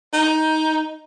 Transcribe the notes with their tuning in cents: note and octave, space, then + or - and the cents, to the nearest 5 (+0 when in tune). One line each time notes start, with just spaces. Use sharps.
D#4 +15